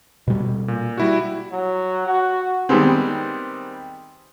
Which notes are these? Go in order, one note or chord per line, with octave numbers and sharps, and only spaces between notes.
B2 G3
A#2
G3 E4 F#4
F#3
F#4
D#3 G3 G#3 B3 C4